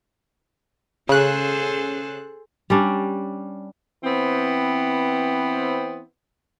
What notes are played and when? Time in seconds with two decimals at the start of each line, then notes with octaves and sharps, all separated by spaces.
1.09 C#3 G#4 A4 C5 F#6
2.70 G3 C#4 D4
4.03 E3 B3 C4